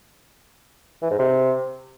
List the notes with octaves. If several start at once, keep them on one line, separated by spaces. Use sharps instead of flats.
E3
G#2
C3